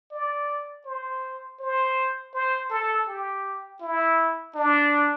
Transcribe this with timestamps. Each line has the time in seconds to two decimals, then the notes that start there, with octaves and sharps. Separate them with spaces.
0.12 D5
0.86 C5
1.60 C5
2.34 C5
2.70 A4
3.08 G4
3.81 E4
4.56 D4